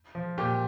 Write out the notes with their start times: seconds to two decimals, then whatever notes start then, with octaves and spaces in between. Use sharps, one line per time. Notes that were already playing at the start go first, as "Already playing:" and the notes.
0.15 F3
0.38 A#2 G4